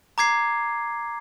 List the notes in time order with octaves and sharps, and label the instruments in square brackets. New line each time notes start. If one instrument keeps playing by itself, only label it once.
[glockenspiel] A#5 D6 G#6 C7